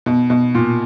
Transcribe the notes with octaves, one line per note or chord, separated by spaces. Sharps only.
B2
B2
A#2